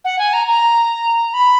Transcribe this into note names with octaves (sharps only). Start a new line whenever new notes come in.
F#5
G#5
A#5
A#5
B5